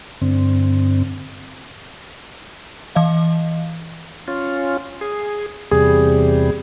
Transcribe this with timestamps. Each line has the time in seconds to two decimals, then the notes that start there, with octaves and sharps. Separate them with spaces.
0.21 G2 D3 C4
2.96 E3 D#5 F5
4.28 C#4 F4
5.01 G#4
5.71 E2 C3 G3 G#4